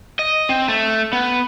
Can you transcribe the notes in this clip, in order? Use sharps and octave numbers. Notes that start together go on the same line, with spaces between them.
D#5
C4
A3
B3